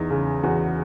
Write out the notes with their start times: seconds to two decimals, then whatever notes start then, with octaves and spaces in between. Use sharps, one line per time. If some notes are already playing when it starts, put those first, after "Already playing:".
Already playing: E2 D#4
0.10 C#3
0.43 E2 F#4